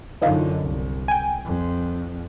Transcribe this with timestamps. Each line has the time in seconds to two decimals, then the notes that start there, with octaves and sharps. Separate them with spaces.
0.22 F#2 D3 E3 D#4 F4
0.60 C2
1.08 G5 G#5
1.45 F2